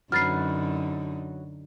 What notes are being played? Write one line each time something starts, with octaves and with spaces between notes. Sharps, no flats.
F#2 D3 F#3 D#4 B4 F6 A6 C7